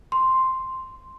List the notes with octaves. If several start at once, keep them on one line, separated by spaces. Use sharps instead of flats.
C6